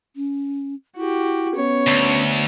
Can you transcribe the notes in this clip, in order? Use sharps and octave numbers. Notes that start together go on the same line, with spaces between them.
C#4
E4 F#4 G4
B3 C#4 C#5
D2